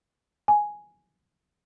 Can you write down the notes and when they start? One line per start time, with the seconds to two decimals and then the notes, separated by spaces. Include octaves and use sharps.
0.48 G#5